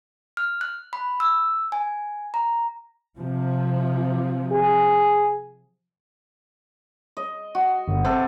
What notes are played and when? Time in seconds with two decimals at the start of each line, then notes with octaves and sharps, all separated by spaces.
0.37 F6
0.61 F#6
0.93 B5
1.20 E6
1.72 G#5
2.34 A#5
3.16 C3 F3
4.52 G#4
7.17 D#5
7.55 F#4
7.88 G1
8.05 C3 A4 C5